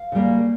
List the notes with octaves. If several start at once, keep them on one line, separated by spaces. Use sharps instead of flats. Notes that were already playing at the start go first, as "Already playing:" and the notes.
Already playing: F5
C#3 G3 A#3